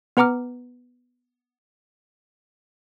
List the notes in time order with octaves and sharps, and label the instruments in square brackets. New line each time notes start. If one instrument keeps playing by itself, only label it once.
[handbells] B3 B4 F#5 A#5 D6 F6